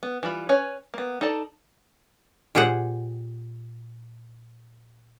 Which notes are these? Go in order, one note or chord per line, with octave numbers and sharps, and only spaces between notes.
B3
E3 G3 F4 B5
C#4 B4 C#5 G#5
A#3 B3
D#4 A4 D5 A5
A#2 G4 G#4 C5 F#5